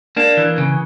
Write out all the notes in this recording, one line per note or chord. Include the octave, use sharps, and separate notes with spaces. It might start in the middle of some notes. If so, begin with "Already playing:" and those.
A#3 D4
E3
C#3